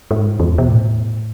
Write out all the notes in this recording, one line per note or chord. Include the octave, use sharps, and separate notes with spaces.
G#2
E2
B2
A2